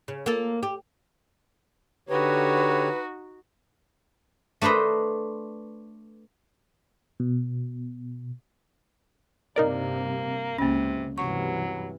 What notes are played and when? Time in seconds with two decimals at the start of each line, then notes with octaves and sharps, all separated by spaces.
0.08 C#3
0.26 A#3 F4 A4
0.63 G4
2.09 D3 D#4 F#4 G4 B4 C#5
4.62 A3 D4 B4 C5 D#5
7.20 B2
9.56 G2 C3 A#3 D#4 A#4 D5
10.58 C#2 C3 A#3 C#4
11.18 G2 C3 E3 F#3 C#6